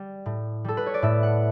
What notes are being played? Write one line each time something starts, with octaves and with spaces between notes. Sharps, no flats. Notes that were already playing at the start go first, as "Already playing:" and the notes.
Already playing: G3
A2
G3 A4
B4
C#5
D5
A2 E5
F#5